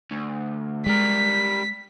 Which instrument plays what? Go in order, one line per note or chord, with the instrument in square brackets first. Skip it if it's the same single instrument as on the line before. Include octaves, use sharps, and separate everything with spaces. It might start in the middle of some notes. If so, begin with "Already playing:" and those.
[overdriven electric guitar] D2
[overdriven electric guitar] G3 A#4 [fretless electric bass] G#3 [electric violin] B6